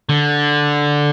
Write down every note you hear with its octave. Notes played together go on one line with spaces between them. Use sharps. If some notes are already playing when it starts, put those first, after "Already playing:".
D3